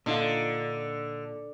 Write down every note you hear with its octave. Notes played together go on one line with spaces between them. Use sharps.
A#2 D3 D#4 F4